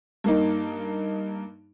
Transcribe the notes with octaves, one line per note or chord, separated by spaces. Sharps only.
G2 A#3 D#4